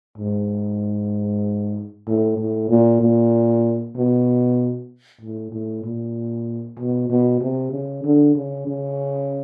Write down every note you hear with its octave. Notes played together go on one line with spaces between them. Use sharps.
G#2
A2
A2
A#2
A#2
B2
A2
A2
A#2
B2
B2
C3
C#3
D3
C#3
C#3